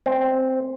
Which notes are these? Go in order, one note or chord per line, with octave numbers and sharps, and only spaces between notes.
C4